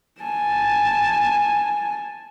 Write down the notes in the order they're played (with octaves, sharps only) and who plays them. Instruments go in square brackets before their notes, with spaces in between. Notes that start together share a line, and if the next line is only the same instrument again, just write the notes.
[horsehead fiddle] G#5 A5